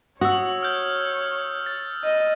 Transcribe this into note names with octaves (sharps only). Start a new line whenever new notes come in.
F#4 C#5 D#6 E6
F6 G6
A6
D#5